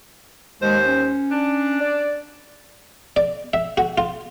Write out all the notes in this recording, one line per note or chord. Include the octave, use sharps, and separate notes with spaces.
D#2 G#3 C5
C#4
D4
D5
D5
E5
F#4
F4